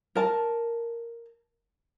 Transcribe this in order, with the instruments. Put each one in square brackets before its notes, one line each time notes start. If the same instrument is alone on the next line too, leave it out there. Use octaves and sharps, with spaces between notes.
[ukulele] A#4 A5